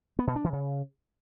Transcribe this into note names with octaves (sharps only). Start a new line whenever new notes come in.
B3
B2
D4
E3
C#3